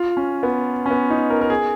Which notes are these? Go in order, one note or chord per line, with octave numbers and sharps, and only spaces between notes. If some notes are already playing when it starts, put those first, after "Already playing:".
Already playing: F4
C#4
B3
C#4
B3
D#4
A#4
A#4
G#4